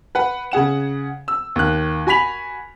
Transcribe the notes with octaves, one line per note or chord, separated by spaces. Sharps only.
B4 F#5
C#3 G#4 F#5 E7
E6
D#2 F#6
F#4 G#5 B5 B6 F7 F#7